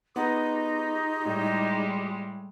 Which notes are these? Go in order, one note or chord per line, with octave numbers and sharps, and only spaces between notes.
B3 D#4 F4 G4 G#4
A2 G3 G#3